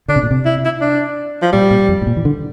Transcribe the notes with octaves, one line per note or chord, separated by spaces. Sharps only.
D3 D4
C3
A#2
C3
E4
E4
D4
F3
A#2 G3
A#2
F2
A2
A#2
E3
D3